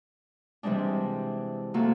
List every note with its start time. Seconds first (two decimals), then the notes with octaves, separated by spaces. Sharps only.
0.63 C3 E3 G3 G#3 D4
1.74 C3 A3 A#3 F#4 A4